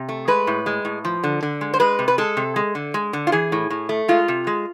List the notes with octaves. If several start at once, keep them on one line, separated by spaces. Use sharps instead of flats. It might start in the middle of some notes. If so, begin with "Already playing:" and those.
Already playing: C3
A3
G#3 B4
A2
G#3
A2
F3
D3
D3
G#3
C5
G#3 B4
C3
B4
G#3 A4
C3
G#3
D3
G#3
D3
F4
E3 G#4
A2
A2
A3
G#3 F4
C3
G#3